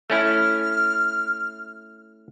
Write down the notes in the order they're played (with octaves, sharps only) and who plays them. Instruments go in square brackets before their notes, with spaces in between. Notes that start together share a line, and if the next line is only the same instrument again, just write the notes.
[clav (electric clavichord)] A3 C#4 E4 [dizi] F6